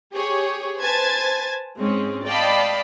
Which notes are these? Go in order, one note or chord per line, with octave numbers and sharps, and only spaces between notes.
G4 G#4 C#5
B4 C5 G#5 A5 G#6 A6
G#2 G#3 C4 C#4
D5 D#5 F5 G5 A5 B5